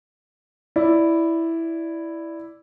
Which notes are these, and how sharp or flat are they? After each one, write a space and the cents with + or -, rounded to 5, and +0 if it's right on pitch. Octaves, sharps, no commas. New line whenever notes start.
E4 +0 D5 +0